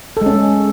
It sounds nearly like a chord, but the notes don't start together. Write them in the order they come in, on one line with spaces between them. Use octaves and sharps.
A4 G#3 C#4